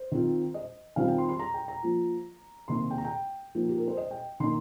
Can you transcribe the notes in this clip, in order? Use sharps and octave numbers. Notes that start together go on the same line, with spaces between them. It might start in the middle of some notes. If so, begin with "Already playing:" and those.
Already playing: C5
D#3 C4 F4
D#5
D#3 G3 C4 F4 F5
G5
C6
C6
A#5
G5
A#5
F3 A#3 F4
C3 D#3 A#3 D#4 C6
G5
A#5
G5
F3 A#3 D#4
G4
A#4
C5
D#5
G5
D#3 A#3 D#4 C6